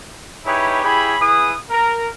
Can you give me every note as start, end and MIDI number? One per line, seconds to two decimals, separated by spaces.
0.45 0.82 63
0.45 0.82 64
0.45 0.82 67
0.45 0.82 68
0.45 0.82 71
0.45 0.82 73
0.82 1.14 64
0.82 1.14 67
0.82 1.14 68
0.82 1.14 73
0.82 1.14 83
1.20 1.53 64
1.20 1.53 68
1.20 1.53 71
1.20 1.53 87
1.70 2.05 70